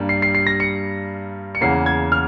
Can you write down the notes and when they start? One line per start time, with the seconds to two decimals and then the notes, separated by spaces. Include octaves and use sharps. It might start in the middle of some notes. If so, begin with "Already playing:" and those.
Already playing: G2 G3 A#3
0.09 C7
0.22 C7
0.35 C7
0.47 A#6
0.60 C#7
1.55 C#7
1.61 E2 C#3 E3 A#3 C7
1.86 G#6
2.12 F6